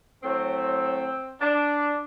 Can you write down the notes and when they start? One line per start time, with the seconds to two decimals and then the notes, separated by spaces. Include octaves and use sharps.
0.23 A2 F#3 C4
1.41 D4